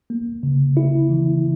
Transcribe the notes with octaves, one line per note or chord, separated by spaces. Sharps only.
A#3
C#3
E4
E3